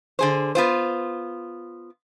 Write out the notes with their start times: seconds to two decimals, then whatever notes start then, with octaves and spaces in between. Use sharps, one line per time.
0.19 D3 G#4 C5
0.55 B3 F4 C5